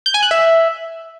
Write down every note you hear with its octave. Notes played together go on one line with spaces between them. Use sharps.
G6
G#5
F#6
E5